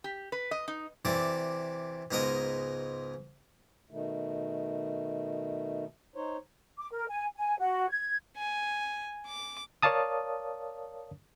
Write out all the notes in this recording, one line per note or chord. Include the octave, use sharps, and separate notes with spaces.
G4
B4
D#5
D#4
C3 E3 F#4 A4 D5
C#2 G#2 B3 F#4 A#4 D#5
B2 D#3 A3
D#4 C5 C#5
D6
A#4
G#5
G#5
F#4
G#6
G#5
D6
A#4 C#5 D5 F5 A5 D#6